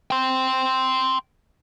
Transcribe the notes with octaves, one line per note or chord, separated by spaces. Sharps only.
G5 C6